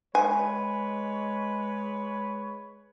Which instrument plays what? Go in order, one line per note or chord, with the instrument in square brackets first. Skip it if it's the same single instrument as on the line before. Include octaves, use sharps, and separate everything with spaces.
[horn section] G#3 B4 C#5 [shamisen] G#5